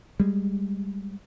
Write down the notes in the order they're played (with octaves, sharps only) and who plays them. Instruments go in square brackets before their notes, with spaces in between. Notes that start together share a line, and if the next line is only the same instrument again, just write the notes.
[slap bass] G3 G#3